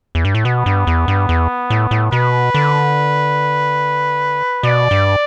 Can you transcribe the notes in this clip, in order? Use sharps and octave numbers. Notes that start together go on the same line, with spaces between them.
E2
G2
A2
B2 B3
G2
E2
G2
E2
A2
A2
B2 B4
D3
B2 D5
G2